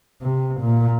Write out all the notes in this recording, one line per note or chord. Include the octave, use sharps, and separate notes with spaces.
C3
A#2